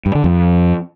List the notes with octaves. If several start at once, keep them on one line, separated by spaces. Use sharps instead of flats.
G2
D3
F2